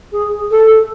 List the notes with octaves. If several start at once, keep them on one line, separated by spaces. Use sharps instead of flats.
G#4
A4